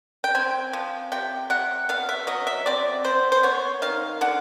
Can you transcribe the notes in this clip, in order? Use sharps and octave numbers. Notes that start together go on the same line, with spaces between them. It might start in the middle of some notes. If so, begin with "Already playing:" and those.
G5
C4 G#5
F3
C3 G5
C3 F#5
B3 F5
E5
F#3 D#5
E5
C4 D5
C4 C5
C5
B3 C#5
D#3 F5
D3 F#5